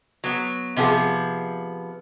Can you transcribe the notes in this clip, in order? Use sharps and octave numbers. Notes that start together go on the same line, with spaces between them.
F#3 B3
C3 F3 B3 G#4